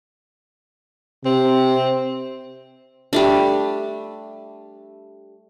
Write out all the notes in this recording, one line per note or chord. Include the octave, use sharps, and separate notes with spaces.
C3 C4
G3 A3 D4